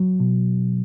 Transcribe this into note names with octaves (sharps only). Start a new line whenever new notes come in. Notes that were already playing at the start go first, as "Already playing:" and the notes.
Already playing: F#3
B2